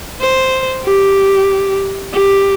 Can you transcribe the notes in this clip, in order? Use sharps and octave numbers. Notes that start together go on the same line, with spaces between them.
C5
G4
G4